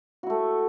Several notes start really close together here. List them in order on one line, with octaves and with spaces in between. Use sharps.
F#4 E4 A3